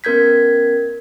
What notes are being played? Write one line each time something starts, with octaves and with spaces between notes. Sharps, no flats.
B3 C#4 A#4 G6 G#6 B6